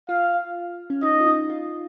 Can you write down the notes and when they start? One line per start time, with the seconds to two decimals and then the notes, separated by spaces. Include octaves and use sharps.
0.09 F4 F5
0.90 C#4
1.03 D#4 D#5
1.20 F4
1.27 D#4
1.50 F4